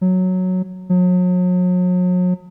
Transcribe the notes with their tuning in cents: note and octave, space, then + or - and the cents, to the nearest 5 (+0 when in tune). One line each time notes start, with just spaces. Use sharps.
F#3 -5
F#3 -40